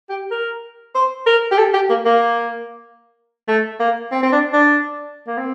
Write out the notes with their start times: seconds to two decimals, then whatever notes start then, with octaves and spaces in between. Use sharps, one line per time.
0.09 G4
0.31 A#4
0.95 C5
1.26 A#4
1.51 G4
1.58 A4
1.74 G4
1.89 A#3
2.05 A#3
3.48 A3
3.80 A#3
4.12 C4
4.23 C4
4.32 D4
4.53 D4
5.27 A#3
5.37 C4